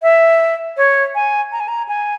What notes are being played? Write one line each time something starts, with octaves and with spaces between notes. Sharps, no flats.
E5
C#5
G#5
A#5
G#5
A#5
G#5